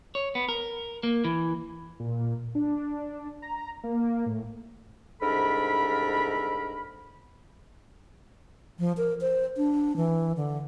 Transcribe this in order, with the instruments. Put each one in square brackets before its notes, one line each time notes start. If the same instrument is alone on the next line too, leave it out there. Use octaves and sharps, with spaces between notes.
[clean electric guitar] C#5
B3
A#4
A#3
E3
[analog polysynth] A#2
D4
A#5
A#3
A2
[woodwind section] C2 G#2 D4 A4 A#4 B5
[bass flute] F3
A#4
C5
D4
E3
D3